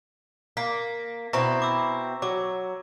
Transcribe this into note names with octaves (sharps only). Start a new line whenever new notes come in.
A#3 B6
B2 C4 E4 A#5 C#6 A#6
D6 E6
F#3 D6